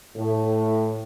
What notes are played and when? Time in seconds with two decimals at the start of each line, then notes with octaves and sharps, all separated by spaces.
0.16 A2